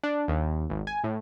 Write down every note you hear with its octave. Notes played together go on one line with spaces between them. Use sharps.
D4
D#2
G#1
G#5
A2